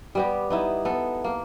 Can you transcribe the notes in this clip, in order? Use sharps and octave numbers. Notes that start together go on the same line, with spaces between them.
G3 B3 G4
B3 D#4 E4
B3 A4
A#3